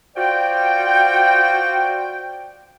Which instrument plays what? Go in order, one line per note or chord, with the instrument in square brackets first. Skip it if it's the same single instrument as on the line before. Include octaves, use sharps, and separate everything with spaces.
[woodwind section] F4 F#4 C5 D5 G5